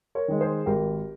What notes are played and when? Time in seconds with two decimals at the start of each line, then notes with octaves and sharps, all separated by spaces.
0.15 A#4 C#5
0.28 D#3 G#3
0.41 G#4 C5
0.66 G#1 G4 A#4